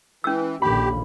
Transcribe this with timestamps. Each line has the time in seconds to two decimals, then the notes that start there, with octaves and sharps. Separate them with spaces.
0.24 E3 C#4 E6
0.62 A#1 D#2 D3 G4 B5